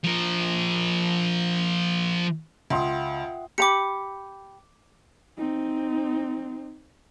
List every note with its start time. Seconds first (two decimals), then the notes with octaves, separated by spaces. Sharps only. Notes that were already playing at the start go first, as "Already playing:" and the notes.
0.04 F3 A#4
2.70 C#2 F4 E5 F#5 G5 C6 D#6
3.58 G4 A#5 B5 D6 C#7
5.38 C4 D#4